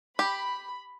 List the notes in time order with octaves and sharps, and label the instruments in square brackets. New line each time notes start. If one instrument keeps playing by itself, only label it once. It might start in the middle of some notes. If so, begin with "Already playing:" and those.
[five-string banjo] G4 [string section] B5